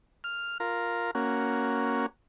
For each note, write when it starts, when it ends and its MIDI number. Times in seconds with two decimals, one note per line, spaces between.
0.24 0.58 89
0.60 1.11 65
0.60 1.11 70
1.15 2.06 58
1.15 2.06 61
1.15 2.06 66